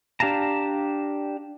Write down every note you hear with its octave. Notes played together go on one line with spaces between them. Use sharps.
D4 G4 F5 A5 A#5